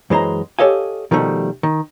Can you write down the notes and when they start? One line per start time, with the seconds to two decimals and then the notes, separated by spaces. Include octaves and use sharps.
0.10 F#2 E3 G#3 C5 A#5
0.59 G4 A4 C#5 D#5 F5 G#5
1.11 B2 D#3 F3 G3 A3
1.63 D#3